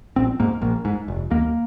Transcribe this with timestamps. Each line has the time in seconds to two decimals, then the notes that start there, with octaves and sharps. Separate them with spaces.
0.16 A#1 C4
0.40 G#2 A#3
0.62 A#1 A#3
0.85 G#2
1.08 F1
1.30 D#2 A#3